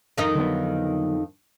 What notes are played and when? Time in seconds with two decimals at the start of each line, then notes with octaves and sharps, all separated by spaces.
0.18 F2 D#3 D#4
0.35 D3 F#3 B3